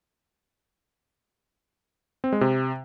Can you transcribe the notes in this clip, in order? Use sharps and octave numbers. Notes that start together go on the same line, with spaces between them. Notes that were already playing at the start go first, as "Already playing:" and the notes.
C4
G#3
C3